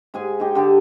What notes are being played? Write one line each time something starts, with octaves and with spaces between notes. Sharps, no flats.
G#2 G#4 G#5
D#4 G4
D3 G4 A5